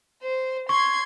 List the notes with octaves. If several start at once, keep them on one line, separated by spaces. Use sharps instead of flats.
C5
C6 C#6 G#6